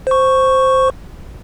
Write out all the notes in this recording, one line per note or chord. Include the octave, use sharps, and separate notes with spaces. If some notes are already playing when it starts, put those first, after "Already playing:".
C5 C#6